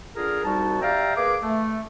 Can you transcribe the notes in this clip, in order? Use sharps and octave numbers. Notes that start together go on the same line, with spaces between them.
D3 F4 G#4 A#4
C2 G3 D#4 F#4 A5
G4 D5 E5 F5 G5 A#5
A#3 G#4 B4 D6
A3